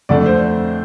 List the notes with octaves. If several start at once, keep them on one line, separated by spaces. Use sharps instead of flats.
F2 D3 A3 D4 D5
C5